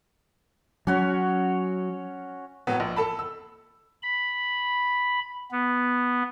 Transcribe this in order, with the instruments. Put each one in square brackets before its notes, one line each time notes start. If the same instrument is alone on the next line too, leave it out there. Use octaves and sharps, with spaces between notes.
[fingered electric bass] F#3 [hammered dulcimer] C#4 F#4 C#5
[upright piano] A2 F#3 B3
A#1
A4 A5 B5
E6
[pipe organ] B5
B3